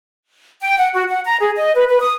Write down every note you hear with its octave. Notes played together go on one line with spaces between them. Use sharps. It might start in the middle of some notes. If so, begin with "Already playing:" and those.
G5
F#5
F#4
F#5
A#5
G#4
D#5
B4
B4
D#6